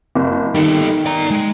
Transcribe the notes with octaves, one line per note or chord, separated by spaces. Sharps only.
F#1
D#3 G3 A4
D5 A#5
G#3